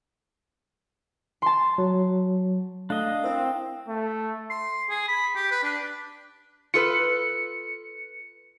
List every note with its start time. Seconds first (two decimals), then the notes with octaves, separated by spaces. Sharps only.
1.42 A5 C6
1.78 F#3
2.90 A3 D4 D#5 F5
3.24 C4 E4 A#4
3.88 A3
4.50 C6
4.90 G#4
5.08 B5
5.36 G4
5.51 B4
5.63 D4
6.74 F4 A4 B4 C#7